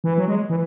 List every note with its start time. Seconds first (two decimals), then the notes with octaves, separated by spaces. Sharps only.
0.04 E3
0.18 F#3
0.28 G#3
0.50 E3